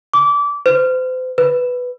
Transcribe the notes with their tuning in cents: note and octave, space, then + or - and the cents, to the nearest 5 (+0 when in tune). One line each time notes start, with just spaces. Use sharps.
D6 -25
C5 -40
B4 +5